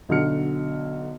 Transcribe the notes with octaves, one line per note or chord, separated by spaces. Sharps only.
B1 D3 F#3 F6 C#7